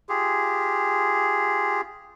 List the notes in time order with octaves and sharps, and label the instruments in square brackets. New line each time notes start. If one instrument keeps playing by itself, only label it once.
[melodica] F4 G4 G#4